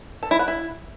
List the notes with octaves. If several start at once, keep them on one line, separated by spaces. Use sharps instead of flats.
A4
E4
F#5
E4